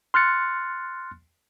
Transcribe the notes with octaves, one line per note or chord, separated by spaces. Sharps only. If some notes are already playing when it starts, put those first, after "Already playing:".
C6 F6 F#6 A6 C#7